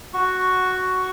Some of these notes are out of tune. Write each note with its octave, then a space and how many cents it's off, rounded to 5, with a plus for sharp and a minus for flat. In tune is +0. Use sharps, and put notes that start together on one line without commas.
F#4 +5 C#6 +0